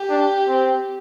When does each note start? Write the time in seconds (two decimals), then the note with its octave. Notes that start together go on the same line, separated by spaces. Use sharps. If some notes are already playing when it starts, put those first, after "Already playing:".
Already playing: G4
0.10 D4
0.48 C4